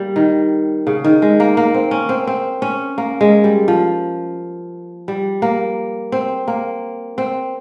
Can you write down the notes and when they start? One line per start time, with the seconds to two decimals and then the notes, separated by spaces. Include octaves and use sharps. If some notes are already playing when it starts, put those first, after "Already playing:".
Already playing: G3 A#3
0.16 D#3
0.87 C#3
1.04 D#3
1.22 G#3
1.40 A#3
1.57 A#3
1.74 C4
1.91 C#4
2.09 C4
2.27 C4
2.62 C#4
2.98 A#3
3.21 G#3
3.44 G3
3.68 F3
5.08 G3
5.42 A#3
6.12 C4
6.48 A#3
7.18 C4